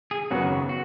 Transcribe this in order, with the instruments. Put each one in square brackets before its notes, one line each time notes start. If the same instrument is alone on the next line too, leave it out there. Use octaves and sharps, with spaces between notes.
[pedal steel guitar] G#4
[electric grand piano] G#1 F#2 C#3 F#3 B3 [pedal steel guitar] F#4
[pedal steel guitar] F#4